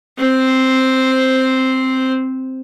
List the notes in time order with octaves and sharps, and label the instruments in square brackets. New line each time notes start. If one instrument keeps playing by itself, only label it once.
[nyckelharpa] C4 C5